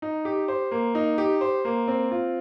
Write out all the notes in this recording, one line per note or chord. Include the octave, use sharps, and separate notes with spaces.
D#4
G4
C5
A#3
D#4
G4
C5
A#3
C4
F4